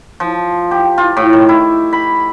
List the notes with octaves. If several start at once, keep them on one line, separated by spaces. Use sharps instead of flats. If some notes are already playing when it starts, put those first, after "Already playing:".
F3
G4
F4
A2
D#3
E4
B5